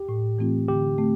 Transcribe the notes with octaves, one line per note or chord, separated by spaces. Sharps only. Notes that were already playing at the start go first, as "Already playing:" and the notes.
Already playing: G4
A2
E3 A3 C4 F4
D3 G4
A3 C4